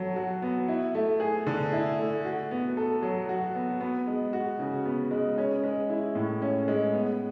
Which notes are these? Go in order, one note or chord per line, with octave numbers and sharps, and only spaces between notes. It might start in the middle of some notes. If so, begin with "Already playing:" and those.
Already playing: F#3 A4
F#4
B3
E4
A3
G#4
D3
E4
A3
F#4
B3
A4
F#3
F#4
B3
B3
G#3
F#4
C#3
B3
G#3
C#4
G#3
E4
A2
C#4
G#3
B3